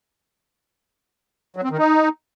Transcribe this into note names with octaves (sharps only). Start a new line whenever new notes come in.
F#3
C4
D#3
D#4